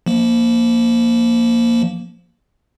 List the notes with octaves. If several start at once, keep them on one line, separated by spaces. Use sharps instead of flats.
F3 A#3